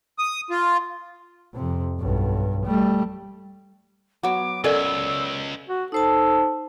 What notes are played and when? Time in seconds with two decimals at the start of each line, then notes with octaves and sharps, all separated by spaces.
0.19 D#6
0.50 F4
1.54 F2 C3
2.00 B1 G2
2.66 G3 A3
4.23 F#3 B3 D6
4.64 C#2 C#4 A4 A#4 D5 G#5 E6
5.68 F#4
5.92 D#4 A4 C5 A5